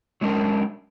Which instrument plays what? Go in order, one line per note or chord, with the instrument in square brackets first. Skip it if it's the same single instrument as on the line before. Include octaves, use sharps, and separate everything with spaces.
[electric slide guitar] F#3 G#3 C#4 D4 A#4